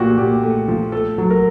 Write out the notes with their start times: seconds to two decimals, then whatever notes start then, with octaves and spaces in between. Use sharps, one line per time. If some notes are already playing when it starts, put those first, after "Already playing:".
Already playing: A#2 F3 A3 F#4 G4
0.18 A#2 G4
0.43 A3
0.68 F3
0.92 A3 A4
1.18 F#3
1.30 A#4